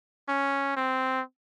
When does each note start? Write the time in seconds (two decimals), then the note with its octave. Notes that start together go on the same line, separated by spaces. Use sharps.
0.28 C#4
0.77 C4